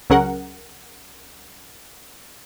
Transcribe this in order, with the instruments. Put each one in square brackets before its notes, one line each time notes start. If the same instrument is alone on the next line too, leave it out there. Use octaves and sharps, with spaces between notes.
[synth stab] C#2 F#3 C#4 G#4 A#4 F#5